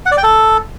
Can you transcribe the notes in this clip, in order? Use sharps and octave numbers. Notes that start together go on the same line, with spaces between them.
F#5
D5
G5
A4